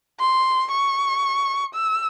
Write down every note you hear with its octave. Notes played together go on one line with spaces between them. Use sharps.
C6
C#6
E6